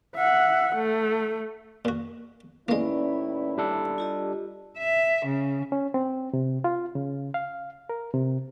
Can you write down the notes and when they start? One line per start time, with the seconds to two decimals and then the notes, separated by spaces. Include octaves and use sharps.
0.16 E5 F#5
0.75 A3
1.85 A#2 F#4
2.68 D#2 A2 G#3 A#3 C#4 E4 B4 D5
3.57 G3 D4 A4
3.98 F4 G4 D#5
4.78 E5
5.26 C#3
5.72 C#4
5.94 C4
6.33 C3
6.64 F4
6.95 C#3
7.34 F5
7.89 A#4
8.14 C3